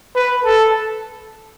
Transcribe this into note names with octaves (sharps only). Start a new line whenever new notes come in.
B4
A4